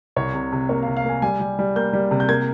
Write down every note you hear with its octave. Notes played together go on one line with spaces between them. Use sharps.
C2 C#5
C3
C3
A#3 C#5
F5
C3
F5
A#3 G#5
G3 G#5
G3
G3
A#3 G6
G3
C3
G6
A#3 G#6